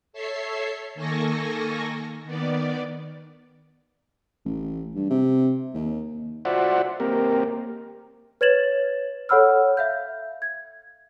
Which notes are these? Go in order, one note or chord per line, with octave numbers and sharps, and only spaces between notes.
A4 C#5 E5 C7
D#3 A#3 A4 G#5 C#6 A#6
D#3 B3 D5
A1
G2
C3
D#2
F4 F#4 C5 D5 E5 F#5
A#3 C4 G4 A#4
B4 C#5 G#6 A6 E7 F#7
A4 C#5 F#5 B5 E6 F6
E5 F5 G6
G#6